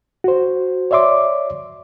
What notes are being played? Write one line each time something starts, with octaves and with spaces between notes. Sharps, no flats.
F#4 C5
C#5 D5 E5 C6 D6